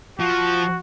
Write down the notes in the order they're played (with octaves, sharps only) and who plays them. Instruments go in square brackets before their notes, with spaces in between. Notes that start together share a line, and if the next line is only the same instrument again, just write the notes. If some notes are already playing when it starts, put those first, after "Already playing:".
[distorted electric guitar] F3 [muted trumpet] F#4